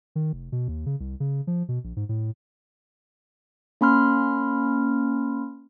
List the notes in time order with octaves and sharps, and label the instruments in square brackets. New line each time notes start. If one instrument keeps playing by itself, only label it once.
[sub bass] D#3
F1
B2
D#2
C#3
C2
C#3
F3
B2
A#1
G#2
A2
[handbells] A#3 C#4 B5 C6 F6